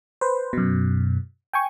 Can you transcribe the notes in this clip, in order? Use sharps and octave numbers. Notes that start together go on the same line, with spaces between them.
B4 C5
F#2 B2
G5 G#5 C#6